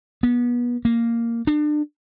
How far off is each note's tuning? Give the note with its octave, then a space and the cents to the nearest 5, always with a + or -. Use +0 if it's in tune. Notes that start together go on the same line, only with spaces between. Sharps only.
B3 -30
A#3 -5
D4 +30